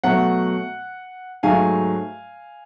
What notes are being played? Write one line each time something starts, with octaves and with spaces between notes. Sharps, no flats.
B2 F#3 A3 F#5
G#2 F#3 A3 F5 G#5